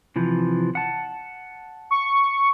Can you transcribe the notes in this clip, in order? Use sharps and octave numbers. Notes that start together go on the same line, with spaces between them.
C3 E3 F3
F#5 A5
C#6